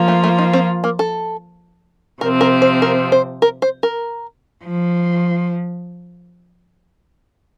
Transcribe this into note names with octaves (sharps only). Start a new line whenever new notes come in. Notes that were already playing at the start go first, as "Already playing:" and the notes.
Already playing: F3 A#3 F4
A3
A3
D#4
C4
A#3
A4
C3 F3 C4 A#4
A#4
C5
A#4
C5
A#4
C5
A#4
F3